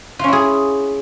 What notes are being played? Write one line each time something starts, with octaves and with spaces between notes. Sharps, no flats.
C#4 E4 F4 G#4